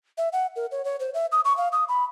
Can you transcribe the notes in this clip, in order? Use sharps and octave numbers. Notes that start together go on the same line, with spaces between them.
E5
F#5
A#4
C#5
C#5
C5
E5
D#6
C#6
F5
D#6
B5